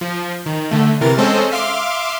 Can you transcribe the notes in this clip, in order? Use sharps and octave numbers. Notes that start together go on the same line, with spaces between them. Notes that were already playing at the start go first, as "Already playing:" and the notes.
F3
D#3
D3 A3
C3 E3 A#4 A6
G#3 C4 C#4 A4 C5 D#5
E5 F5 C6 D6